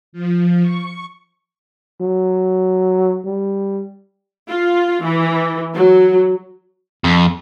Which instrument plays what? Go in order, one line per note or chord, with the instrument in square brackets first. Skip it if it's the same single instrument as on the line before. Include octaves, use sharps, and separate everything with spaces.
[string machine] F3
C#6
[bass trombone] F#3
G3
[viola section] F4
E3
F#3
[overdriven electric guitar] F2